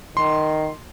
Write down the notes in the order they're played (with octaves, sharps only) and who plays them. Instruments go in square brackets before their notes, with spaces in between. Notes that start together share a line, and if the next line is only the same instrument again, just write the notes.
[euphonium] D#3 [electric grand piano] C6